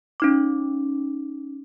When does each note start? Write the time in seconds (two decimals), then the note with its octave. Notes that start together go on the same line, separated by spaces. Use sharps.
0.20 C#4 D#4 D6